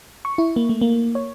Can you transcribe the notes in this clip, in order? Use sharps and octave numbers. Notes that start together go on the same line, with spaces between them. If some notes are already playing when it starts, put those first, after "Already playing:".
C#6
E4
A#3
A3
A#3
C#5